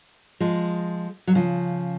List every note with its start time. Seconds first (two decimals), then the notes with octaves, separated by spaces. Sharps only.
0.40 F3 G#3
1.27 F#3
1.35 C#3 F3